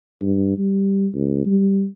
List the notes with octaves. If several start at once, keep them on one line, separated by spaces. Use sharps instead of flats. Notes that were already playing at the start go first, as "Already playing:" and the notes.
G2
G3
C#2
G3